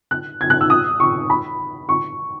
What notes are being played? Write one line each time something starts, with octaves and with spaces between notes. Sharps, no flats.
F#6
G#6
F#6
E6
D#6
C#6
B5
C#6